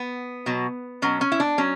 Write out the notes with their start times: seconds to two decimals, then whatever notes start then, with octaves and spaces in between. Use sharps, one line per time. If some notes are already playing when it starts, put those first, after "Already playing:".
Already playing: B3
0.46 B2 F#3
1.02 B2 F#3 C#4
1.21 C#4
1.32 E4
1.40 D4
1.58 F#3 C#4